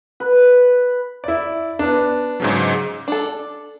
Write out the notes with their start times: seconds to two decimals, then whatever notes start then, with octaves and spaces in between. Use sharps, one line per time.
0.20 B4
1.24 E4 D5
1.79 B3 D4
2.40 G#2 C#3 F#3
3.08 D4 A4